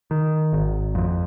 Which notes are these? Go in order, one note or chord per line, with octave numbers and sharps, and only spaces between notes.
D#3
G#1
F2